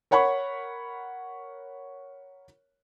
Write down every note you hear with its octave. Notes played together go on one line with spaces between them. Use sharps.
A#4 C#5 F#5 B5 C#6